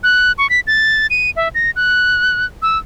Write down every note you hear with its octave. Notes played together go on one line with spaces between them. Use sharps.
F#6
C#6
B6
A6
D#7
E5
A#6
F#6
E6